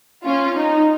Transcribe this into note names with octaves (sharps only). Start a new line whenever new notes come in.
C#4 F4
D#4